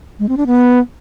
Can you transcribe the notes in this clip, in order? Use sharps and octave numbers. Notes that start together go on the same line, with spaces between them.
G#3
C4
D4
B3